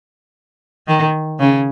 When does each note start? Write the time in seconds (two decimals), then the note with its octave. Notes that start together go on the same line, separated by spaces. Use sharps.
0.87 D#3
1.40 C#3